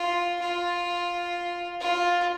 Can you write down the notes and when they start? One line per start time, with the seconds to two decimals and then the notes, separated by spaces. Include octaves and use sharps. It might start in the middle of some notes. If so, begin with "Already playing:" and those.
Already playing: F4
0.41 F4
1.81 F4